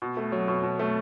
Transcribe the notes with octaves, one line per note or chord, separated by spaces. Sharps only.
B2
A3
F#3
B2
B2
A3